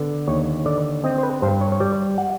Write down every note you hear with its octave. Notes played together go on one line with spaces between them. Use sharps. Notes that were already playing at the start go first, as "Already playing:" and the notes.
Already playing: D3 B3
D#2 C#5
D3 D5
C4 D#5
C5
B4
G2 C5
C#5
C#5
G3 D5
F#5